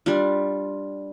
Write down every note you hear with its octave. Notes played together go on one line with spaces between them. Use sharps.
G3 D4 F4